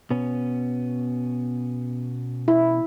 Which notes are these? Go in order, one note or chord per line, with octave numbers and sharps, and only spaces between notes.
B2 B3 C#4
E4